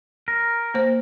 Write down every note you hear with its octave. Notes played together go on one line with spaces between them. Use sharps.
A#4
A#3 C5